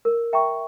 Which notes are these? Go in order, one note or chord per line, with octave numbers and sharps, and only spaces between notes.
A#4
E5 G5 A#5 C#6